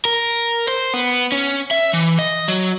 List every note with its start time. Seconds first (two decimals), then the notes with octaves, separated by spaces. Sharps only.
0.05 A#4
0.68 C5
0.94 B3
1.32 C#4
1.71 E5
1.93 E3
2.19 D#5
2.48 F#3